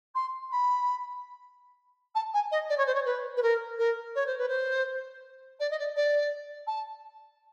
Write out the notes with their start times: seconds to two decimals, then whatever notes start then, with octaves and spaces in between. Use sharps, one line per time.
0.15 C6
0.51 B5
2.15 A5
2.33 G#5
2.51 D#5
2.69 D5
2.77 C#5
2.86 C5
2.94 C#5
3.05 B4
3.36 B4
3.42 A#4
3.78 A#4
4.15 C#5
4.26 C5
4.38 B4
4.48 C5
5.59 D5
5.70 D#5
5.78 D5
5.96 D5
6.67 A5